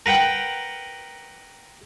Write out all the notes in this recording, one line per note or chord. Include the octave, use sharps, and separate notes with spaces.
A#4 B4 F#5 G5